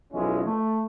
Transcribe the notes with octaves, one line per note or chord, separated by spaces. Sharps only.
B1 F3 G#3 C#4 E4
A3